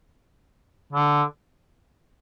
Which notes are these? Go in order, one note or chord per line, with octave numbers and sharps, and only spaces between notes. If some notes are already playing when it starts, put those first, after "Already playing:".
D3